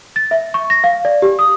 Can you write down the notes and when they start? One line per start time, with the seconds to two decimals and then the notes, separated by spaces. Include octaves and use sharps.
0.16 A6
0.31 E5
0.54 C#6
0.70 A#6
0.84 F5
1.05 D5
1.22 G4
1.39 D#6